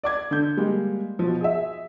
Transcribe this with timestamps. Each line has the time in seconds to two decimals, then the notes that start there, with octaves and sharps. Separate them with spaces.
0.03 D5 D6 G#6
0.31 D3 G6
0.57 G3 G#3 A#3
1.19 B2 F3
1.41 G#4 E5